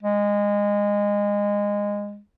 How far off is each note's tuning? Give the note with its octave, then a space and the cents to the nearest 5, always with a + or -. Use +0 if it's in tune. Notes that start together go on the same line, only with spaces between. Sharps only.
G#3 -20